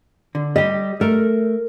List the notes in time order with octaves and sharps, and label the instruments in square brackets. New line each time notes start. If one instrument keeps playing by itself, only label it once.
[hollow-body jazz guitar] D3
[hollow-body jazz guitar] G3 G4 [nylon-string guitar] D#5
[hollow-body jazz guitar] A3 [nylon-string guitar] A#4